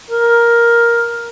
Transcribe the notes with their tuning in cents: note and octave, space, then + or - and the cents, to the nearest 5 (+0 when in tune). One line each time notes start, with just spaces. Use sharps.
A#4 +10